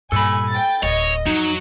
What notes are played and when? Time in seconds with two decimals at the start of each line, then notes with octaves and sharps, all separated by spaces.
0.12 G2 A#2 A4 G#5 B5
0.49 G5 A6
0.83 D1 C#5 D#5
1.26 F2 F#3 D#4